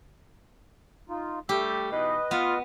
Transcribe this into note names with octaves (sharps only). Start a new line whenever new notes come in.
D#4 F4
G3 A3 G4 E6
B2 E3 D#4 B4 D#5
B3 F4